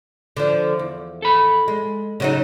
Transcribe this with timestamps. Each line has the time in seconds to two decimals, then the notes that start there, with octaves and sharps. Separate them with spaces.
0.37 D3 F3
0.79 E2
1.22 A4 B5
1.68 G#3
2.20 C#3 F#3 D#4